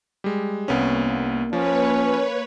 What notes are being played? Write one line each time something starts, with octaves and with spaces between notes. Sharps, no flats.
G3 G#3
C2 A#3 B3 C#4
F3 C#4 B4 C#5